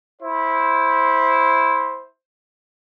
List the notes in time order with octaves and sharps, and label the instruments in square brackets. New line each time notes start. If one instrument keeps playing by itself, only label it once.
[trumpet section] E4 C5